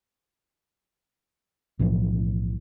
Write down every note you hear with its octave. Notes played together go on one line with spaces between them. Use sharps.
B1 A2 E3 F3